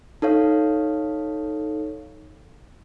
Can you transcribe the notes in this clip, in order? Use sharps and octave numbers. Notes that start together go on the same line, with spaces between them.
D#4 A4 C#5 F5